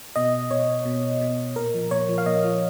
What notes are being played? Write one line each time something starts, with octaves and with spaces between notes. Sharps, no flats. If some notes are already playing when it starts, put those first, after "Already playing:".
B2 D#5
B2 C#5
B2
B2
A#2 A#4
F3
A#2 C#5
F3
F5
A#2 D#5
F3